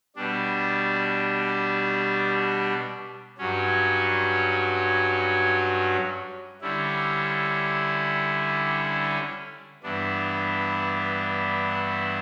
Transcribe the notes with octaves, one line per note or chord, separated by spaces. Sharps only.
B2 G3 D4
G2 F#3 C#4
D3 G3 C#4 E4
G2 E3 B3 D4